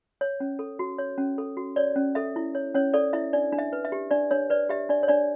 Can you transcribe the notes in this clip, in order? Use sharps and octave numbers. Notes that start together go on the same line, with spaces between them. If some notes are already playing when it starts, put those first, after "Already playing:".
C#5
C#4
A4
F#4
C#5
C#4
A4
F#4
C#5 D5
C#4
A4 E5
E4
C#5
C#4 C#5
A4 D5
E4 E5
D4 D5
D4
E5
B4
E5
G4
D4 D5
D4 C#5
B4 D5
G4 E5
D4 D5
C#5
D4 D5